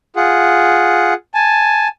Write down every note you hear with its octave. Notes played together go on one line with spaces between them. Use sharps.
F4 G#4 F#5
G#5 A5